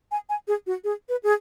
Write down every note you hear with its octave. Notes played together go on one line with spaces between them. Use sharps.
G#5
G#5
G#4
F#4
G#4
B4
G#4